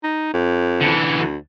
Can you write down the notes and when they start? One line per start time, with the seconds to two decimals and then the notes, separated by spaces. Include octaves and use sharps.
0.03 D#4
0.34 F2
0.81 D3 E3
1.20 D2